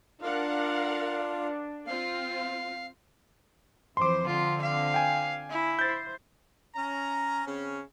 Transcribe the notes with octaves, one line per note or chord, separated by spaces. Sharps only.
D4 F4 A#4 F5 F#5
C4 F4 F5
F2 E3 C5 C6 D6
D3 C4 F4
F5
G5 G#5
E4
C5 G6 A6
C#4 A#5
C#3 C4 C#4